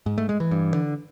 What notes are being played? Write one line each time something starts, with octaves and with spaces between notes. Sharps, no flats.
G#2
A3
G#3
E3
G2
D3